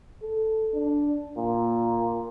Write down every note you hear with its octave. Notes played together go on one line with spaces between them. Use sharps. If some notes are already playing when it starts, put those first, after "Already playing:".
A4
D4
A#2